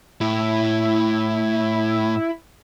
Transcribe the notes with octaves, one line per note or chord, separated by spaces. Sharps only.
A2 E4